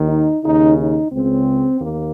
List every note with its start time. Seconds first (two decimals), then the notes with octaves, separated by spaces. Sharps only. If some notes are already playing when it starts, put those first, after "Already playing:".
Already playing: D#2 D#3
0.09 D#4
0.43 D#2 C#3 D#4
0.77 D#4
1.12 C#2 C#3 C4
1.81 D#2 A#3